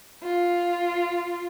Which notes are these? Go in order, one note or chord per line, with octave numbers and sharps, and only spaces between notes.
F4